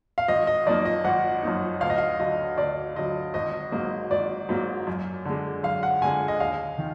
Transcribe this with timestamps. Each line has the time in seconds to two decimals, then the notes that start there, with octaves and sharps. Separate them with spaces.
0.18 F5
0.28 G#1 D#5
0.47 D#5
0.67 F#2 F3 A#3 D#4 D5
0.85 D#5
1.04 G#1 F#5
1.43 F#2 F3 A#3 D#4
1.81 D2 F5
1.90 D#5
1.98 F5
2.19 D3 F#3 D#5
2.58 D2 D5
2.96 D3 F#3 D#5
3.34 G#1 D#5
3.72 G#2 F#3 A#3
4.11 G#1 D5
4.49 G#2 F#3 A#3
4.87 F#2
5.25 D3 G#3
5.63 F#2 F5
5.83 F#5
6.01 D3 G#3 G#5
6.28 D#5
6.40 D#2 F5
6.78 D#3